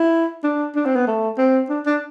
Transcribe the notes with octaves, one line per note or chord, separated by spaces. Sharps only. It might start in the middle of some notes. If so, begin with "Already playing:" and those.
Already playing: E4
D4
D4
C4
B3
A3
C4
D4
D4